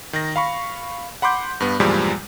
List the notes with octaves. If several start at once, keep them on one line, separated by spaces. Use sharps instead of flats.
D#3 A#6
F5 B5 C#6
F#5 B5 C6 D6 G6
G2 B3
E2 G2 A#2 F3 G3 G#3